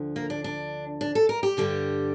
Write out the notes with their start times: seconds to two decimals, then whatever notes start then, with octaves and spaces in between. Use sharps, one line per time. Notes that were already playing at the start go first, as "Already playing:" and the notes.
Already playing: D2 D3 F3
0.16 A#3
0.30 D4
0.44 D4
1.01 D4
1.15 A4
1.29 A#4
1.43 G4
1.57 G2 D3 G3